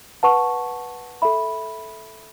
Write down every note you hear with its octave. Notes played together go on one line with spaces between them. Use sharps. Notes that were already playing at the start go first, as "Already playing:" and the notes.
B4 F#5 A5 C#6
A4 E5 B5